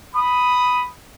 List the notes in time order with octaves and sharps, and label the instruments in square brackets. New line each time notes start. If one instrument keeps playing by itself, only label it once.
[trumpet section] B5 D#6